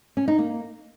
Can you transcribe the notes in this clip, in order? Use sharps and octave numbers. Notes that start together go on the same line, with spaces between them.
C#4
D#4
A#3